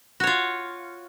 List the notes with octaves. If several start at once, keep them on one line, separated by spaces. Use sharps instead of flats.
F4 F#4 C#5